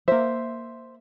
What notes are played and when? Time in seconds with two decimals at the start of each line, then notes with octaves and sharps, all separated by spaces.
0.08 A#3 C5 E5